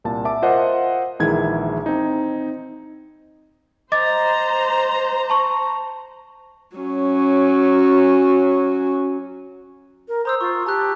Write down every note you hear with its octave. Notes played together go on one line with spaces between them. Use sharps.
C2 A#2 A5
E5 A5 D6
F4 A#4 C5 D#5 E5 F#5
A#1 D#3 E3 G#3 E4 G#6
C4 D#4
C5 D#5 A#5 D6 A6
A5 C#6
F#3 C#4
A#4
C5 A#5 D#6 E6
F4 C#6
G4 A5 A#5 F#6